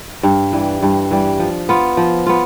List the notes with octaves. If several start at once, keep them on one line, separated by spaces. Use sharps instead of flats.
G2
E3 G3
G2
E3 G3
F3
B3 F4
F3
B3 F4